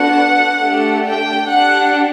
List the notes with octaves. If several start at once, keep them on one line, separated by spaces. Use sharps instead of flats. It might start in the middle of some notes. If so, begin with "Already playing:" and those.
Already playing: B3 D4 F#4 A4 F#5
A3 D4 G4
G5
D4 G4 F#5